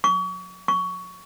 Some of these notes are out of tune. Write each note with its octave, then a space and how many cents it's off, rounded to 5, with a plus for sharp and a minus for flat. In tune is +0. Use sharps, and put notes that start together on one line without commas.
C#6 +35
C#6 +15